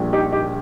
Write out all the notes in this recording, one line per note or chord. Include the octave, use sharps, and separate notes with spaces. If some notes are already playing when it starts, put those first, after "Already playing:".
Already playing: A#1 A#2 G3
D#4 G4
D#4 G4